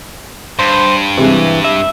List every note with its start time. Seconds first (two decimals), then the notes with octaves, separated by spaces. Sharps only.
0.59 G2 C5
1.18 C3 E3 G3 G#3
1.64 E5